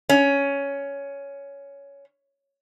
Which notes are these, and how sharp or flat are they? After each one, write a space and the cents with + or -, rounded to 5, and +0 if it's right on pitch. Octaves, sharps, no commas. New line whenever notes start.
C#4 +10